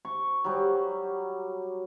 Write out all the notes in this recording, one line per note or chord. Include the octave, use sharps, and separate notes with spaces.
C#6
F#3 G3